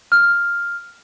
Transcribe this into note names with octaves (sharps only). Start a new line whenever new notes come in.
F6